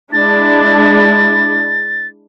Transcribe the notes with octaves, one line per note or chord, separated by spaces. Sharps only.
G#3 D4 E4 A6